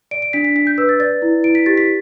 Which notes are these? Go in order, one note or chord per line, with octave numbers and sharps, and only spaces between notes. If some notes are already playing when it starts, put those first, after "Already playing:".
D5 D7
D7
D4 B6
B6
D4 B6
G6
B4 E6
A6
D5 A6
E4
E4 D7
B6
G4 A6
B6